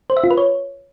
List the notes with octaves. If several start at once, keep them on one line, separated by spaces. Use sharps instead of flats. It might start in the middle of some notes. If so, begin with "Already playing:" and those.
C5
E5
F4
B4
C#5